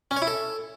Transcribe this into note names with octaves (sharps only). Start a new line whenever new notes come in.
C#4
C#5
E4
A4